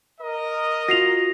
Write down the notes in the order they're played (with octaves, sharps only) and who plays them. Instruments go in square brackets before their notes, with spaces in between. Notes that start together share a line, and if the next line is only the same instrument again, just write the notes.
[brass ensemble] A#4 D#5
[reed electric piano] F4 F#4 [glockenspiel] A#6 C7 F7